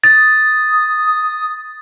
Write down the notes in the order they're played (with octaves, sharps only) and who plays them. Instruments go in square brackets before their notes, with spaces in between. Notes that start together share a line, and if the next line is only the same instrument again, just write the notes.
[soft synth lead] D#6 [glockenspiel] A6